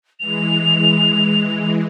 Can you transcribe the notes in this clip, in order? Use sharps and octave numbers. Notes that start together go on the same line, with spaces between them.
E3 G#3 F7